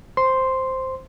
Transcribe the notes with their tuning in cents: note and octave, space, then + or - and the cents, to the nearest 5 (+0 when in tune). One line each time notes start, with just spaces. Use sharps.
C5 +0 C6 +0